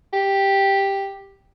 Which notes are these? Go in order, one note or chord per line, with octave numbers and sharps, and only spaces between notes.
G4